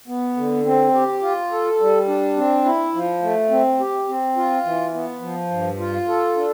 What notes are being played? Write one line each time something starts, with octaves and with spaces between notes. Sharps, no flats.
B3
D3
C4
G4
F4
A4
G3
D4
C4
E4
F3
A3
C4
G4
C4
F4
E3
B3
F3
G2
F4
A4
D4